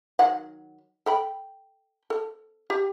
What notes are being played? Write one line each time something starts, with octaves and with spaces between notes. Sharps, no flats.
D#3 F#3 F#5
A4 G5 B5
A4
G4